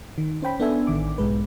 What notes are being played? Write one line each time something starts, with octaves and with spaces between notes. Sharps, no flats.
D#3
C#4 C5 G5 B5
B3 D4 A4 E5 G#5
A1 D#3 D6
B1 G#2 G#3 B4